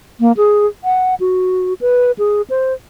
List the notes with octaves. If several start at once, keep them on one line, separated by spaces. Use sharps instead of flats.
A#3
G#4
F#5
F#4
B4
G#4
C5